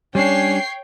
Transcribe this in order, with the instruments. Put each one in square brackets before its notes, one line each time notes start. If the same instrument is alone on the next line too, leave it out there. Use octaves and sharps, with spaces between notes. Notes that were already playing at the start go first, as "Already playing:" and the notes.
[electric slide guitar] G3 D4 [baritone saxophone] C#4 [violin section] C#5 G5 C7